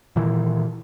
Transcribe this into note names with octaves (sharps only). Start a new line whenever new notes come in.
A#2 D#3 E3